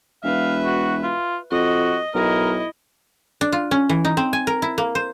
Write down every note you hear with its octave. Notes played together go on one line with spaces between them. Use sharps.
E1 B4 E5 F5
F#4
F4
F2 F#4 D#5
B1 E4 A#4 D#5
D4
F4
C#4
E3
D#4
C4
G#5
A#4
E4
A#3
C5